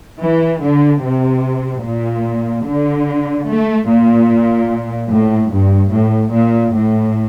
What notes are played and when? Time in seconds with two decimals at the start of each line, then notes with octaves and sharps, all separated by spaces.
0.19 E3
0.61 D3
1.01 C3
1.83 A#2
2.64 D3
3.46 A3
3.87 A#2
5.10 A2
5.50 G2
5.91 A2
6.32 A#2
6.72 A2